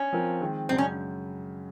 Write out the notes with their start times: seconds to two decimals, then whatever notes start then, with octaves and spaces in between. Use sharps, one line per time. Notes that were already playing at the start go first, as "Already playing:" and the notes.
Already playing: C#4
0.13 F3 C4 F4 A#4
0.41 D#3 G#3 C4
0.69 F#2 C#3 G#3 C4
0.78 C#4